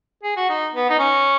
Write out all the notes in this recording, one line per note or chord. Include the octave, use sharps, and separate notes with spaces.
G#4
F#4
D#4
B3
D#4
C#4